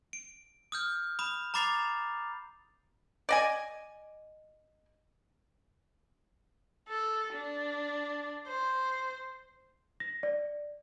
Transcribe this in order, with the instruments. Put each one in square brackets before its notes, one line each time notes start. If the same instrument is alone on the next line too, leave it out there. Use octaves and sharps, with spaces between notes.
[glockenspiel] D7
D#6 F6 G6
B5 D#6 E7
A#5 B5 D6 A6 C7 F7
[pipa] D5 D#5 G#5
[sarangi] A4
D4
C5
[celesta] A#6
D5